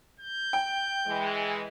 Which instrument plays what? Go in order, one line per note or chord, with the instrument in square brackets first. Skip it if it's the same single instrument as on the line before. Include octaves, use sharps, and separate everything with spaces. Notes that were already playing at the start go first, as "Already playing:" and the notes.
[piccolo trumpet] G6
[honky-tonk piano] G5
[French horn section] E3 G#3